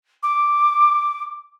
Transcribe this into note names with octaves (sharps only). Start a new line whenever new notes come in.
D6